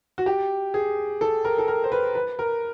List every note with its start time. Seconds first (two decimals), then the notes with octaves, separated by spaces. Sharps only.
0.18 F#4
0.26 G4
0.74 G#4
1.21 A4
1.45 A#4
1.58 A4
1.68 A#4
1.84 C5
1.92 B4
2.15 B4
2.39 A#4